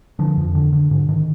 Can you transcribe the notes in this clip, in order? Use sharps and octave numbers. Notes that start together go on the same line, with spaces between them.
D3 F3
F2
D3
D3
G#2 D3
G#2 D#3